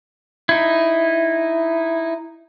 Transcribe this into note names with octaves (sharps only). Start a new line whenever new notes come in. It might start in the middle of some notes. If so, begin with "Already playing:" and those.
D#4 E4